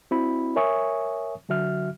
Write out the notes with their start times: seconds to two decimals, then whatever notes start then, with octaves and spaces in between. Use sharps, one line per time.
0.11 C4 E4 F#4 B5
0.56 A#4 C#5 E5 G#5 C#6 D#6
1.49 D3 F#3 F#4 E5 F6